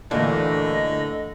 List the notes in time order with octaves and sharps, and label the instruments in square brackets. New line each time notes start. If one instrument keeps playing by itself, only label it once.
[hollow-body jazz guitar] D2 A#2 [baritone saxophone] D3 [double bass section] E3 A3 A#3 [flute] D#5